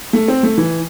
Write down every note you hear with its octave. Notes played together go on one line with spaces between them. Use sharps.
A3
C4
A3
E3